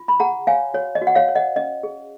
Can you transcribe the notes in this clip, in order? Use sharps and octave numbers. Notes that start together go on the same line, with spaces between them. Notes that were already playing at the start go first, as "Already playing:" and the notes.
Already playing: F4
B5
G#4 F#5 A#5
C#5 F5 G#5
F#4 C#5
D#5
F#4
F#5
C#5 F5
C#5
D#5 F#5
C#4 D#5
G#4